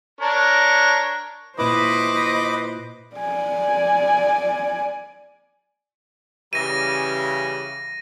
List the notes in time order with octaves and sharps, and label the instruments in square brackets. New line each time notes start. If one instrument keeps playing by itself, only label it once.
[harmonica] D4 A#4 C#5
[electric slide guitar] A#2 E4 [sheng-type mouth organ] B4 D6 [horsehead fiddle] C5 B5 [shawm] D#5
[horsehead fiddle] D5 G#5
[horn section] C#3 E3 G3 [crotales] A#6 D#7